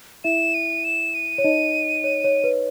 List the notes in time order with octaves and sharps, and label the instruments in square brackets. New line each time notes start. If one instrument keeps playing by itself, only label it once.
[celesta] E4 E5 [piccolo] E7
[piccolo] D#7
E7
D#7
[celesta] C#5
D#4 D#5
C#5
C#5
B4